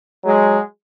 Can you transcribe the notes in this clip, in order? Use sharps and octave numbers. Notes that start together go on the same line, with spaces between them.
F#3 G#3